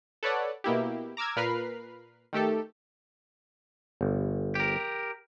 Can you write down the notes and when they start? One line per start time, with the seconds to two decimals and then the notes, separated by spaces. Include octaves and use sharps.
0.23 A4 B4 C#5 D5 F#5
0.64 B2 A#3 E4 G4
1.17 A#5 D6 E6 F6 G#6
1.36 A#2 A#4 B4 B5 F6 C7
2.33 D#3 A3 G4 A4
4.01 G1
4.55 G4 A#4